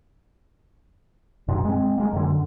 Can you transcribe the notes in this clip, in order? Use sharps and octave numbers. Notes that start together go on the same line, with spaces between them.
F#2 A#2
G#3 C4
G#3 A#3
F#2 D3